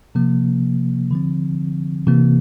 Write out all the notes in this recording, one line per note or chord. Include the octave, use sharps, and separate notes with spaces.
C3 F3 A#3
D3 F3 C4
C3 E3 A#3